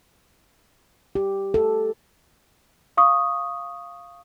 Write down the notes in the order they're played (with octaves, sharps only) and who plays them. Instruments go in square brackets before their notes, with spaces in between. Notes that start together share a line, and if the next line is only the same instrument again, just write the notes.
[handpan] G4
A4
[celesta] F5 C#6 D#6